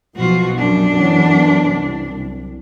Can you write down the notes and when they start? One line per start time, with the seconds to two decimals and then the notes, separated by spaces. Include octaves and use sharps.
0.16 B1 B2 F3 F4 F#4
0.56 F#2 D4
0.98 E3 B3 C#4
1.67 C2